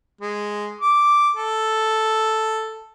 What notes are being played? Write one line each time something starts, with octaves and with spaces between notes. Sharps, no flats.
G#3
D6
A4